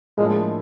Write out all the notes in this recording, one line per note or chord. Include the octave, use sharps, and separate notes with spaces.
A2 F3 G#3 A#3 D4 F4